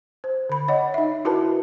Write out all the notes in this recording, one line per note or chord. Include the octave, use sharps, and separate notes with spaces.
C5
D3 B5
C#5 D#5 F#5
D#4 E5
E4 F#4 A#4 B4 A5